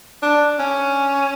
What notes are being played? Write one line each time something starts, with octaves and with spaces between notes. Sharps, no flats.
D4
C#4